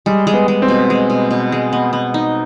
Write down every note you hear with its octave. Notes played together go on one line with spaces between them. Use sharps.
G3 G#3
G#3
B3
G#3
C4
B2
G#3
B2
B2
G#3
B3
B3
D#4